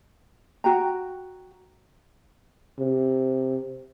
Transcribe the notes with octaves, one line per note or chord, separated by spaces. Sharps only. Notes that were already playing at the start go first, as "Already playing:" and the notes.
F#4 G5 A#5
C3